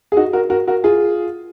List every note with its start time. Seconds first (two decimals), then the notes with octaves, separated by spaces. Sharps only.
0.12 G#4
0.17 D#4 F#4
0.33 F#4 A#4
0.50 F#4 A#4
0.68 F#4 A#4
0.84 F4 G#4